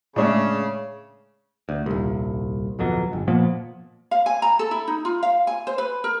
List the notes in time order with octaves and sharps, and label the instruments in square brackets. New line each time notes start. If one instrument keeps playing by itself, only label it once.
[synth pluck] A2 G#3 A3 [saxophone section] C#3 [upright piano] D4 C#5 E5
[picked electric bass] D2
D#1 C2
D1 F2 B2 F#3
G1
A#2 F3 A#3 B3
[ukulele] F5
G#5
A#5
A4
E4
D#4
F4
F5
G#5
C5
B4
A#4